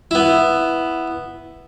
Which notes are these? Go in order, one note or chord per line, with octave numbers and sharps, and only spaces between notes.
B3 E4